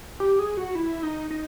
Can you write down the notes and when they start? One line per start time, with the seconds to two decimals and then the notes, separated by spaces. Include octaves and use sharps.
0.20 G4
0.39 G#4
0.57 F#4
0.75 E4
1.03 D#4
1.31 D#4